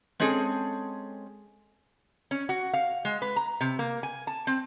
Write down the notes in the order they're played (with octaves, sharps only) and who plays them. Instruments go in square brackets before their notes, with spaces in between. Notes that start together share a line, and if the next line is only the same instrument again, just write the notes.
[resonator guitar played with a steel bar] G#3 C4 C#4 G#4 A4
C#4
F#4
F5
G#3
B4
A#5
C3
A#3
G#5
A5
C4